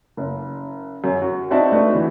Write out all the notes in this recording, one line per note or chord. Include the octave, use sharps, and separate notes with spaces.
F#1
F#2
F#4
C4 D#4 F#4 D5 E5 A5
A3 D4 F#4 B4
E3 B3